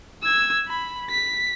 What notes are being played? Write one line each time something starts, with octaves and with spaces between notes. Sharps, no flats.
E6 G#6
B5
B6